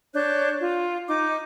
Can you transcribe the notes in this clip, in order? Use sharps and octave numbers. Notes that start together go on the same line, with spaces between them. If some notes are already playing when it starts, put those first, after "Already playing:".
D4 C#5 F#6 G6
F4
D#4 D6